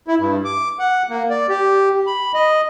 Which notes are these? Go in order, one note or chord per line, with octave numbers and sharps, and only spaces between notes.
E4
G2
D6
F#5
A#3
D5
G4
B5
D#5